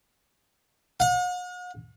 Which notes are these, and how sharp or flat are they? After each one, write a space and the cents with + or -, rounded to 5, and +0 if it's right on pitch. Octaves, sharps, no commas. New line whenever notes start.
F#5 -45